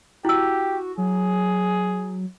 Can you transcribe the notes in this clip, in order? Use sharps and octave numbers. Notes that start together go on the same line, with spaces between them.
E4 F#4 G4 E6
F#3 G#4